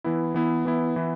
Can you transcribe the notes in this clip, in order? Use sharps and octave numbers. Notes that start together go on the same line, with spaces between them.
E3 B3 E4
E3 B3 E4
E3 B3 E4
E3 B3 E4